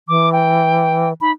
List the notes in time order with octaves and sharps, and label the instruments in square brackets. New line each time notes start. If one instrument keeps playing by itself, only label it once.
[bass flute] E3 [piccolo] D6
[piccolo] G5
[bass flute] D#4 [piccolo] B5